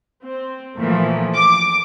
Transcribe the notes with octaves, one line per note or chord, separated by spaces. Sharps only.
C4
A#2 E3 F3 A3 A#3
D6